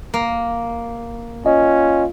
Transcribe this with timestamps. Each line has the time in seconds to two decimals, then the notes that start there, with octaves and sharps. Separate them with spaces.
0.14 A#3
1.46 C#4 F4 D#5